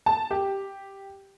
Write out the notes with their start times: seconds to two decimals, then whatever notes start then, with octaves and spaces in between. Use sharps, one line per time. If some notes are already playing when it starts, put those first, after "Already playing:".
0.06 A5
0.31 G4